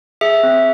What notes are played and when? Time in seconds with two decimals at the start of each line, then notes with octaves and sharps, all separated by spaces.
0.21 G#4 E5
0.43 C4